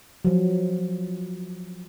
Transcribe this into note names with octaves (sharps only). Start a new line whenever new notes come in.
F3 F#3